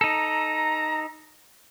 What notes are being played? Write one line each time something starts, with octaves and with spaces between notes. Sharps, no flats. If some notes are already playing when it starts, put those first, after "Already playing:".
D#4 A4 A#5